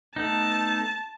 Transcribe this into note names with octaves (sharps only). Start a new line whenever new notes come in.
A3 B3 D#4 A5